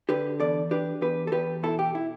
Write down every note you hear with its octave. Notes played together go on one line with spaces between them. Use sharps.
D3 G4 B4
E2 A4 D5
D4 G4 B4
E2 G4 B4
A4
E2 G4 B4
B2 E4 A4
G4
E4